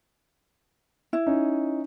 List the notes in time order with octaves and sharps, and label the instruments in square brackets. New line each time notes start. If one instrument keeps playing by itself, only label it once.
[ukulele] E4
[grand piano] C#4 D#4